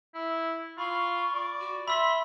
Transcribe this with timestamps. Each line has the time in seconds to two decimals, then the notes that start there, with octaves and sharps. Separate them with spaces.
0.14 E4
0.78 F4 B5 C#6
1.35 D5
1.61 F#4
1.88 E5 B5 C6 E6 B6